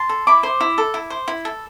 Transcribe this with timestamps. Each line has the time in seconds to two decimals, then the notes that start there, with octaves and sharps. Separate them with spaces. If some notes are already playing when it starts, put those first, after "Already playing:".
Already playing: A5 C6
0.09 A4
0.27 E4 B5 D6
0.43 C5
0.60 E4
0.78 A4
0.94 E4
1.10 C5
1.28 E4
1.45 A4